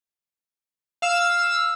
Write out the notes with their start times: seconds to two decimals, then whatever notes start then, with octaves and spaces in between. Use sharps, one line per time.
1.02 F5 E6